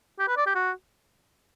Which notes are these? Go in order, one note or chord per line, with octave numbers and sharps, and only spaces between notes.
G4
B4
D5
G4
F#4